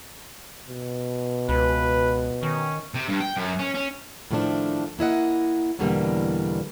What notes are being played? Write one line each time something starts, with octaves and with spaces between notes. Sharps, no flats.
B2
C#2 B4
D#3 C#4
C3
G2
G5
F#2
C#4
C#4
A2 D#3 F3 A3 C#4 D4
A#3 E4 D#5 F#5
E2 B2 D3 E3 G3 A#3